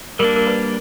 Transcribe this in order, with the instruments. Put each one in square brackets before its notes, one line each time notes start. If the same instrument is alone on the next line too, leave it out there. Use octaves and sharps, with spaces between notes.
[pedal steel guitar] G3 A#3 D4 [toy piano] A#4
[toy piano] A#4
B4